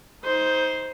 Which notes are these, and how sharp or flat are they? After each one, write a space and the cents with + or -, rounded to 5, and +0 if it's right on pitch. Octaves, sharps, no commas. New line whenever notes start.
D#4 +25 C5 +0